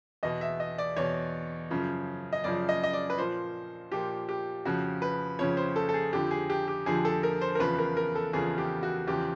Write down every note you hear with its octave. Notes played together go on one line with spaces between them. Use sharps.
E2 B2 D#5
E5
D#5
D5
E2 B2 C#5
F#2 C#3 F3
D#5
F#2 C#3 F3 D5
D#5
D#5
D5
B4
A#2 F3 C5
A#2 F3 G4
G4
F2 C#3 F3 F#4
B4
F2 C#3 F3 C#5
C5
A4
A4
G#4
F2 D3 F3 G4
G#4
G4
G4
F2 D3 F3 G#4
A4
A#4
C5
A#4
E2 C#3 F3 B4
A#4
A#4
A4
E2 C#3 F3 G#4
G4
F#4
E2 C#3 F3 G4